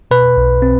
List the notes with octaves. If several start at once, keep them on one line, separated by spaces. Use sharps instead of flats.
B2 B4
B1
C4